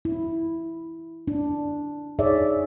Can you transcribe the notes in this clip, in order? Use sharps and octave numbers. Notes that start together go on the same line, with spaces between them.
E4
D4
D#4 G#4 C#5 D5 E5